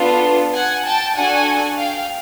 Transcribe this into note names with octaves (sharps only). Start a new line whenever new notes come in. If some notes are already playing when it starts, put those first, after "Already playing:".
Already playing: B3 D4 F4 A4
F#5 G#5
G5 A5
D4 F#4 A4 F#5 G#5
F5 G5